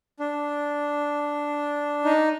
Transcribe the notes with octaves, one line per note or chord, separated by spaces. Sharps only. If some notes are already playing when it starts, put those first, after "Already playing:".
D4
D#4